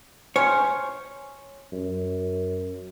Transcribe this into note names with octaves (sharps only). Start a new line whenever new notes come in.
C#4 C5 C#5
F#2